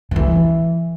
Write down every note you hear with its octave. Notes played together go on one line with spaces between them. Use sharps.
D#3
E3